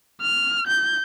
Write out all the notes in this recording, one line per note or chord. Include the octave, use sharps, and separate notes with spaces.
F6
G6